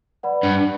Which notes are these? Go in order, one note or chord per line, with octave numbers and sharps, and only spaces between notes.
B4 D5 F#5 B5
G2